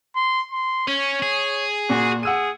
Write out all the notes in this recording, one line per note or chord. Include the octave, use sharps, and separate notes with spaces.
C6
C6
C#4 C#5
G#4
A#2 F#4
G#4 F#5 E6 D#7